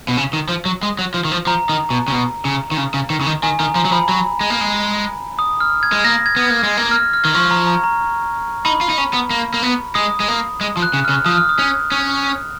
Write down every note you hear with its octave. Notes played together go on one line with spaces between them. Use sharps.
B2
C#3
D#3
F3
F#3
G#3
F#3
F3
D#3
F3
F3 A#5
D#3
B2
C#3
B2
C#3
D#3
C#3
C#3
D#3
C#3
D#3
D#3 G#5
D#3 A#5
F3 A#5
F#3
F3 B5
F#3
G#3
A#3
G#3
D#6
F6
G#6
G#3
A#3 A#6
G#6
B3
A#3 G#6
G#3
A#3
F6
F6
D#3
F3 C#6
A#5
A#5
A#5
D#4 B5
F4
D#4
C#4
B3
A#3
A#3
B3
G#3 D#6
G#3
A#3
G#3
F3
F#6
C#3
C#3 F6
F3 D#6
F6
D#6
C#4
C#4